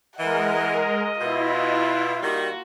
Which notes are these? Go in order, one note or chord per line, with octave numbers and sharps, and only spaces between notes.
E3 G#3 A#4 D#5 F#5
B2 E4 F4
D#3 G3 A#3 F#4